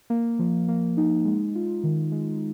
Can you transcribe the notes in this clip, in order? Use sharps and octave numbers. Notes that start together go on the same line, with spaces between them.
A#3
F3
A#3
D#4
G#3
F4
D#3
G#3